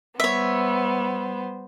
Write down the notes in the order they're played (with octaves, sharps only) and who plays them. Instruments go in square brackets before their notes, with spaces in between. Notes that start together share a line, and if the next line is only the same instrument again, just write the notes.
[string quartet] G3 B3 C5 [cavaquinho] C#5 E5